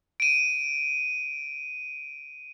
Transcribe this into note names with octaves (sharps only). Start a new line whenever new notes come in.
D7 D#7